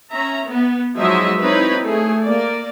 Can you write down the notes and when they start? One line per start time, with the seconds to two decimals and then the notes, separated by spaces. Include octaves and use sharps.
0.11 C#4 E5 A#5
0.46 B3
0.97 F3 F#3 G#3 D#4 D#5 E5
1.43 C4 D#4 E4 B4 C#5 B5
1.84 A3 G#4
2.22 A#3 D5